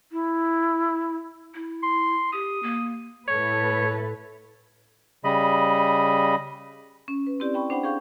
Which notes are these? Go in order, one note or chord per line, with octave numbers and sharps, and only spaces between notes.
E4
E4
C6
G4 D#6
A#3
A2 A4 B4 C#5
C#3 G3 D#5 B5
C#4
B4
C4 E4 G4 D5
G5 B5 C#6
D4 C5 F#5 G5 B5
G#4 C5 F5 G5 C#6 G6